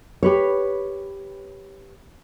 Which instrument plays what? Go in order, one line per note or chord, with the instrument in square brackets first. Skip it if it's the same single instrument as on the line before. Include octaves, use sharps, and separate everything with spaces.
[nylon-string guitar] G4 B4 C#5